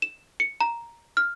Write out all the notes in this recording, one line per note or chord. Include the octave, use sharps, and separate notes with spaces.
E7
C#7
A#5
F6